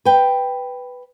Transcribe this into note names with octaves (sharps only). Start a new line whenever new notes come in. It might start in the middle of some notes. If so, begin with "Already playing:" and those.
B4 G5